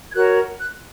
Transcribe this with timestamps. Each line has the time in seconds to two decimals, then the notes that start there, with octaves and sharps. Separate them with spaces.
0.12 G#6
0.16 F#4 A#4 C#5 F#6
0.59 F#6